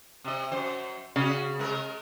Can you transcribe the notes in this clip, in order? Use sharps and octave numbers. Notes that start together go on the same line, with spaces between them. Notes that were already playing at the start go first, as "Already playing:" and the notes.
C3 D#5
F#2 C5
C#3 C#4 F#4
G#3 A#4